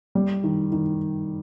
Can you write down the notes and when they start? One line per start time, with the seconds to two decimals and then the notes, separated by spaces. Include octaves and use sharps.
0.15 G3
0.44 D#3
0.72 D#3